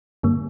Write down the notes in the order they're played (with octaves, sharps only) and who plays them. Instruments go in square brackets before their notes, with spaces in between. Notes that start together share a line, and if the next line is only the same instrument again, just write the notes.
[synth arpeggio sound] G2 D3 G3 A#3